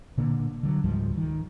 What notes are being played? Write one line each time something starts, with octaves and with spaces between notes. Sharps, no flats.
A#2 D3 A#3
D3 E3 F#3
C#2 G#2 F3 G3
D#3